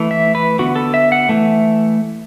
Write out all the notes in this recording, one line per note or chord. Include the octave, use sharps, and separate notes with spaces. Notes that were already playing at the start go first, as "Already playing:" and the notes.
Already playing: E3 A3
E5
B4
D3 B3 F#4
A4
E5
F#5
E3 A3